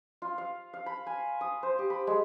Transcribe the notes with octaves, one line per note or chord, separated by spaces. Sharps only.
F4
F5
F5
B5
G#5
D#6
C5
G4
B5
G#3